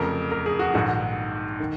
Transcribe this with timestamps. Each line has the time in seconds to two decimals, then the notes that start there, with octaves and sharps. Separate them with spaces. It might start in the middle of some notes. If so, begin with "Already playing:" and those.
Already playing: F1 F2 C#3 A#4
0.31 A#4
0.46 G#4
0.59 F#4
0.74 A#1 G#2 D#3 F#4
1.60 D#3